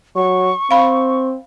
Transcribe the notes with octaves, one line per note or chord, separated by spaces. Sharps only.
F#3 C#6
C4 F5 B5